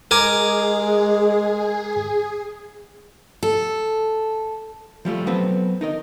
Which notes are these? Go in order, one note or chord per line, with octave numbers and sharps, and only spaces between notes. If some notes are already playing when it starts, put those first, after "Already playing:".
G#3 G#4 A#4 G#5 D6
A4
F3 G3 A3 F4
F#3 B3 C4 A4 B4
D#4 A#4 D#5